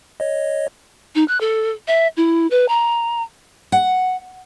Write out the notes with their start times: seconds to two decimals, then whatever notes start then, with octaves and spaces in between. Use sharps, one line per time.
0.20 C#5 D#5
1.15 D#4
1.28 F#6
1.41 A4
1.88 E5
2.17 E4
2.51 B4
2.68 A#5
3.72 F#5